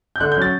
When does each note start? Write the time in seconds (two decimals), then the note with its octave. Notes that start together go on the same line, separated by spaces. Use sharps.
0.16 G6
0.20 D3 F#6
0.32 G6
0.37 F#3 C#4 A6